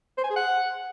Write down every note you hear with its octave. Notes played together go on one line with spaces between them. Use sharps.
C5
G#5
G#4
F#5